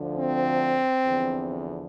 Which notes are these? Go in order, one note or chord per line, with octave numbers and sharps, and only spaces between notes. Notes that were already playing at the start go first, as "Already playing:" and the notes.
Already playing: D2 D3 F3
C4
E2 D3 F3